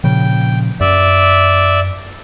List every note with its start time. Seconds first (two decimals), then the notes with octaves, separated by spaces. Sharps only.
0.04 A#2 C#3 F3 G5
0.80 F#2 D5 E5